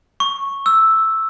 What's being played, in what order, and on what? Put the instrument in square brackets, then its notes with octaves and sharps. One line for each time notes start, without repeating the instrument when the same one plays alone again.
[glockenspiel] C#6
E6